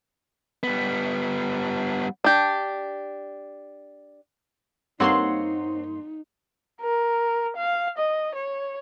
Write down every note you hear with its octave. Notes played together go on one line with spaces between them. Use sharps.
G3 B3
D4 G4
G2 A#3 C4 D#4 C#5 F#5 C6
A#4
F5
D#5
C#5